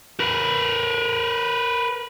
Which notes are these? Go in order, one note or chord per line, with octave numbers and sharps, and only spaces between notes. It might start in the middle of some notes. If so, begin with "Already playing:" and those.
A#4 B4